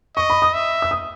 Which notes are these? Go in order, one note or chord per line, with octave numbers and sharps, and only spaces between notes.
D#5 C#6
B5
D#6
E5
E6
D#6